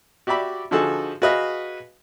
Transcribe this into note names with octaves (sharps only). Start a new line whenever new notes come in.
F#4 G4 D5 E5 B5 D6
D3 F3 D#4 F#4 G#4 A4
F#4 G#4 B4 D#5 F5